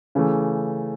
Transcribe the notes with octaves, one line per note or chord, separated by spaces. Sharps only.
C#3 E3 A3